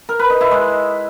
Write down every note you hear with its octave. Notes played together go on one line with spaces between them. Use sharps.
A#4
B4
D#4
E4
G#3